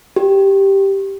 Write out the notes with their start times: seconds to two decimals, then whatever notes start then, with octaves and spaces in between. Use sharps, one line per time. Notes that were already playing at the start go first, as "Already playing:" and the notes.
0.16 G4